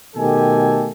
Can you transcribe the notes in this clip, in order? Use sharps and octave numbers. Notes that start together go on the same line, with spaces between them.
B2 D#3 A3 G4 A4 G#5